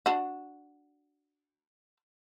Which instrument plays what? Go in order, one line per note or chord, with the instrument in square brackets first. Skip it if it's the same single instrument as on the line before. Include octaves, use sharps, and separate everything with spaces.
[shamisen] D4 F#4